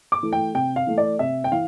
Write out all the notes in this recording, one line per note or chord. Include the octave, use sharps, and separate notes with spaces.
D6
E3 A3
G5
C3 G5
F5
E3 A3
D5
C3 E5
G5
E3 F5